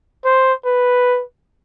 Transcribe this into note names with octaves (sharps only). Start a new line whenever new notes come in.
C5
B4